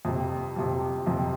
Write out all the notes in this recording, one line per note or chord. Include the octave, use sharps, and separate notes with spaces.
F2 C3 F3
F2 C3 F3
F2 C3 F3